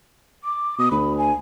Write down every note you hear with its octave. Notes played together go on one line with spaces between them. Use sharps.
D6
B2 D#6
D2 B5
G#5